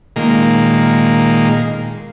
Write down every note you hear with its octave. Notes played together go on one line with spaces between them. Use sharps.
A#2 D#3 G#3 A#3